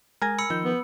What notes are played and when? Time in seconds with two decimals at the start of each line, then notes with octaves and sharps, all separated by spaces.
0.22 G#3 A#4 G#5 A#5
0.39 B5 E6 C#7
0.50 D#3 F3 G6
0.65 B3